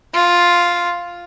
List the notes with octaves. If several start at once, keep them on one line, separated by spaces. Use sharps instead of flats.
F4